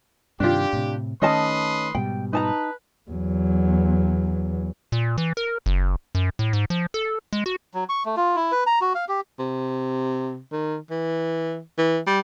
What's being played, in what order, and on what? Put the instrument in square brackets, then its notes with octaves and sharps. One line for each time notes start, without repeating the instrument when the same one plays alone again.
[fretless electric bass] G2 C3 D#3 [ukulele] D4 F4 [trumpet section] G4
[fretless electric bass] A2 C3
[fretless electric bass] D#3 A3 [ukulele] C#4 D#5 A5 [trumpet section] B4 C6 D#6
[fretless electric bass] G#2 B2 G3 [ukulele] G5
[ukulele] D#4 A5 A#5 [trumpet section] B4
[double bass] E2 F#3
[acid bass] A#2
E3
A#4
F#1
F#2
A2
G#2
F3
A4
G#3
F#4
[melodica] F#3
C#6
A3
F4
E4
B4
A#5
F#4
F5
G4
[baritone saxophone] C3
D#3
E3
E3
G3